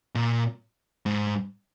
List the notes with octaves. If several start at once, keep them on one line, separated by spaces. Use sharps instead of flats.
A#2
G#2